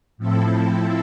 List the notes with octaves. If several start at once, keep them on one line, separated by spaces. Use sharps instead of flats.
A2 F3 C4 E4 A4